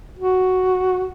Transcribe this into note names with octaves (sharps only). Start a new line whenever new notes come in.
F#4